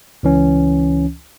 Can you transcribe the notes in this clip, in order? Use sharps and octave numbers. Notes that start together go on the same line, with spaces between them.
C#2 E3 C#4